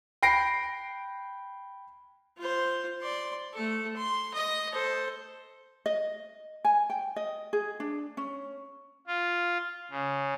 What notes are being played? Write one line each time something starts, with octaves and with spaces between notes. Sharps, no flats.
G5 B5 A#6 C7 D7
F4 C5
D5 C6
A3 A4
C6
D#5
A4 C5
D#5
G#5
G5
D#5
G#4
D4
C#4
F4
C#3